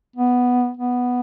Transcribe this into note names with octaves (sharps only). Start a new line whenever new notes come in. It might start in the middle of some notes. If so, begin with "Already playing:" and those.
B3
B3